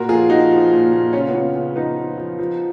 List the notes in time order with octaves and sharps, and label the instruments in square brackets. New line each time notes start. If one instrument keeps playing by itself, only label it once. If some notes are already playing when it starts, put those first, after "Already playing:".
Already playing: [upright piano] A#2 F#4 A#4
F3 F4 G#4
F3 D#4 F#4
F3
A#2
A#2
C#3 C#4 F4
B3
C#3 C#4
C#3 C#4
F3 B3 D#4
F3
F3
F3